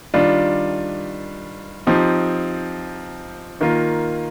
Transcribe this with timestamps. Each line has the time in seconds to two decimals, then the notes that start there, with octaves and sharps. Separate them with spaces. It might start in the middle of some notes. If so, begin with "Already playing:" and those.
0.14 D#3 G3 D4 F4
1.87 F3 C4 D#4 G4
3.61 D#3 A#3 F4